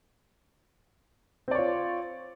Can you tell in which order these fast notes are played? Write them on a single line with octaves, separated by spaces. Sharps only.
C4 D5 C#5 F4